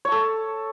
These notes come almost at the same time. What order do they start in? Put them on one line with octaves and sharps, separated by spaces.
C#5 A5 A4